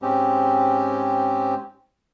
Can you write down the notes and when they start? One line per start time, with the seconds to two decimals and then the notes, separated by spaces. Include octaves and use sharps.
0.02 G#2 G#3 C4 C#4 G4